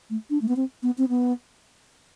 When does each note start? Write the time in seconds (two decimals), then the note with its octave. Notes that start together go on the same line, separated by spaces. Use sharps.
0.10 A3
0.30 D4
0.42 A3
0.48 B3
0.56 C4
0.83 B3
0.98 C4
1.09 B3